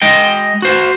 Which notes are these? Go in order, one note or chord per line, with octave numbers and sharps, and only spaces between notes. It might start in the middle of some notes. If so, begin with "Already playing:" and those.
G#3 D#5 G5
F#4 C5